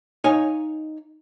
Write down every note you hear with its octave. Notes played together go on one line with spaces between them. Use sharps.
D#4 C#5 F5 G#5